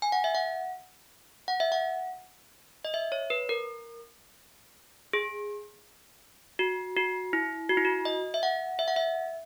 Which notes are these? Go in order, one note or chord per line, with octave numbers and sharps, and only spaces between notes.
G#5
F#5
E5
F#5
F#5
E5
F#5
D#5
E5
C#5
B4
A#4
G#4
F#4
F#4
E4
F#4
E4
F#4
D#5
E5
F#5
E5
F#5
E5